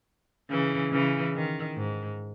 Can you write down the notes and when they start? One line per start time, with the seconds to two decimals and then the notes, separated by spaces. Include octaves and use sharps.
0.50 C#3 E3
0.92 C#3 E3
1.35 D#3
1.77 G#2